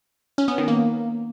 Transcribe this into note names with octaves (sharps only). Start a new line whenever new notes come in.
C#4
B3
D#3
A#3